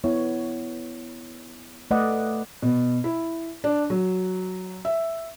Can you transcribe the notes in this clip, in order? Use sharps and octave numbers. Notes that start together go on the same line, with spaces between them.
B3 E4 C#5
A3 B4 D5 D#5 F#5
B2
E4
D4
F#3
E5